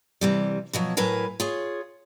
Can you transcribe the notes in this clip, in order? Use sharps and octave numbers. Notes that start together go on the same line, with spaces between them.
C3 E3 G3
B2 F3 F#3
A2 F#3 A#4 B4 G#5
F4 G#4 C#5